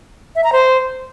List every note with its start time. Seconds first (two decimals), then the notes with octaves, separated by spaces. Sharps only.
0.35 E5
0.44 A#5
0.52 C5